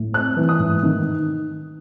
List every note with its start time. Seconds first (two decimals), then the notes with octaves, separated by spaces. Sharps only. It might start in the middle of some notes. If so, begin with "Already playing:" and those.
Already playing: A2
0.13 C4 F#6
0.37 E3
0.49 D#6
0.59 G#2
0.83 D#3